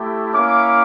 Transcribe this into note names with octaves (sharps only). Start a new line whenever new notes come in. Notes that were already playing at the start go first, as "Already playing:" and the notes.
Already playing: A3 E4 G4
A#3 C#4 E4 D6